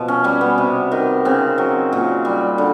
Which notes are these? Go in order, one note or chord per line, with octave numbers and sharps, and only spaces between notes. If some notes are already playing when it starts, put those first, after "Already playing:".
Already playing: B2 F3
C#4
G3 C#4
B3
C3
D#3
C#3 C4
F#3
A#2
G3
D3